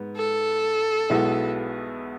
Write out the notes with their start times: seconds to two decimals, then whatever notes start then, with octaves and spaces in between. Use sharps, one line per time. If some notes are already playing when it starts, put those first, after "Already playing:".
Already playing: G#2 B3
0.17 A4
1.10 B1 B2 G#3 B3 E4